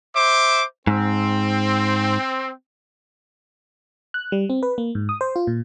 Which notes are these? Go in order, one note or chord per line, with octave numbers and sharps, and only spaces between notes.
C5 E5 D6
G#2 C4
F#6
G3
C4
B4
A#3
G#2
D#6
C5
F4
A#2